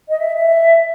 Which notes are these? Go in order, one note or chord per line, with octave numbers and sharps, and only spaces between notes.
D#5
E5
E5